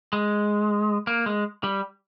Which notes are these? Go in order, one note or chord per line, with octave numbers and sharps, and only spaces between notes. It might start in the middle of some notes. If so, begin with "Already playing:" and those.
G#3
A#3
G#3
G3